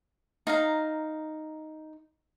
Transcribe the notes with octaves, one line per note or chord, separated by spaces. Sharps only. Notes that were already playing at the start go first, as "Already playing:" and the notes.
D#4 F5 A#5